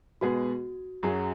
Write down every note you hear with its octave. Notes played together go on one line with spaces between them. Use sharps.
B2 G#3 B3 F#4 G#4
F#2 F#3 C#4 G#4